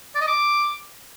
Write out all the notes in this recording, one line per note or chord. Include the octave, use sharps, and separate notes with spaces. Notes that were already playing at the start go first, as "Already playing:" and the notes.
D5
D#5
D6